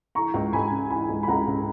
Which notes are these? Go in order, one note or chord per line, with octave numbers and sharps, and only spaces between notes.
E3 A#5 C#6
C#2
C#2 G#5 B5
C#3
E3 G#5 B5
C#2
B5
C#2 F#5 A#5
C#3